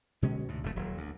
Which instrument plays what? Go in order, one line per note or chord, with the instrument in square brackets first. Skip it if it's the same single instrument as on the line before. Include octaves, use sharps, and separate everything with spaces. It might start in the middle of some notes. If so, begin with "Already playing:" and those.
[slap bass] B2 D3 G#3 C#4
D2 G#2
F#1 F2 C3 A3
D#1 F#3
D2